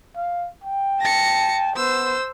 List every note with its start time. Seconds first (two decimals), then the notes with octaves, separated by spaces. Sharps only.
0.15 F5
0.64 G5
1.01 A5 A#6 C#7
1.76 B3 C5 E6